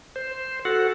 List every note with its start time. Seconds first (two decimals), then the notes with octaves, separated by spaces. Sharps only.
0.16 C5
0.65 F#4 A4 F#5